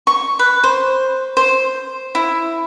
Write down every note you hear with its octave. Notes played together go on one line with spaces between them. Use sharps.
C#6
B4
C5
C5
E4